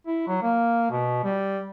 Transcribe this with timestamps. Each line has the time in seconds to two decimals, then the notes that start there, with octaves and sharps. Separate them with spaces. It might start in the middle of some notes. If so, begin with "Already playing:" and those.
0.07 E4
0.27 F#3
0.42 A#3
0.91 B2
1.24 G3